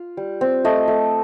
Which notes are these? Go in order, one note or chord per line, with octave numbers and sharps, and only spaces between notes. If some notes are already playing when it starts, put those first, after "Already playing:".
Already playing: F4
G3
C4
A3 D#5
A3